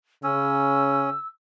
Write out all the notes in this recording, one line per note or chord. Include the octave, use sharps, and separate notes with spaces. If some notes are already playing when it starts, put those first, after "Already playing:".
C#3 C#4 E6